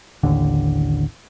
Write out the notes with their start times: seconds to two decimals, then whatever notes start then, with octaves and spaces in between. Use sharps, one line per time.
0.23 A1 D#2 D3